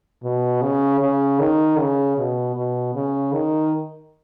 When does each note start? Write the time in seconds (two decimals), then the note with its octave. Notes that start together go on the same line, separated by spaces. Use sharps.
0.23 B2
0.62 C#3
1.01 C#3
1.40 D#3
1.79 C#3
2.17 B2
2.55 B2
2.95 C#3
3.33 D#3